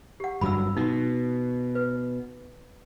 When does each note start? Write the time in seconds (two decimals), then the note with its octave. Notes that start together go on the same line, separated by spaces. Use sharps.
0.20 G4 F#5
0.41 G1 G2 F#3 B5 E6
0.77 B2 D#4 F#4
1.75 B4